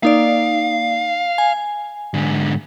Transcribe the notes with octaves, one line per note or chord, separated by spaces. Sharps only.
A#3 D#4 D5 F5
G#5
G#2 D3